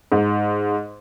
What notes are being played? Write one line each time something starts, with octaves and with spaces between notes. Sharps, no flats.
G#2